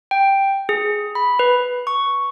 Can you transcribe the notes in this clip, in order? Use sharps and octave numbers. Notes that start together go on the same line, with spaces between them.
G5
G#4
B5
B4
C#6